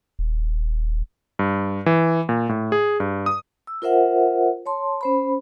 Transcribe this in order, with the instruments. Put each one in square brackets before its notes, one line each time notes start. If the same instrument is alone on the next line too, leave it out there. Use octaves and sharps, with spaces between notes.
[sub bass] D#1
[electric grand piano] G2
E3
A#2
A2
G#4
G2
D#6
[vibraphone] E6
F4 A#4 C5 E5 F#5
C#5 A5 C6
C#4 C5 B5